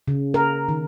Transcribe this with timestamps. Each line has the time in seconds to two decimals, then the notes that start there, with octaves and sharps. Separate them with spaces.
0.08 C#3
0.34 A#4
0.69 D#3